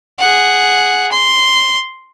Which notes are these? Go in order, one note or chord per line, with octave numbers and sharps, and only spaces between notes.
G#4 F#5
C6